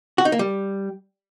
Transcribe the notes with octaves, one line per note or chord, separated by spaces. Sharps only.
F#4
D#4
A#3
G3